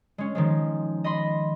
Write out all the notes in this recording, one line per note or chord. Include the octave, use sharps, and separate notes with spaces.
G#3 C#4
D#3 F3 G#3
D#5 B5 C6